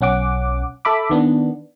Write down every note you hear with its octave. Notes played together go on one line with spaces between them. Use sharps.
B1 C#4 F#5 D6
A4 E5 B5 D6
D#3 B3 D4